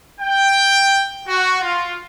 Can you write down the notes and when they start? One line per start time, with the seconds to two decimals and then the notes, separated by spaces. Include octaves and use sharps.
0.21 G5
1.28 F#4
1.62 F4